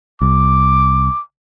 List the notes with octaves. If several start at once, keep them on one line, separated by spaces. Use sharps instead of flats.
C2 D6